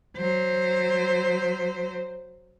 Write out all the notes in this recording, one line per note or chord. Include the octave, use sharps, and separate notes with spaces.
F#3 C5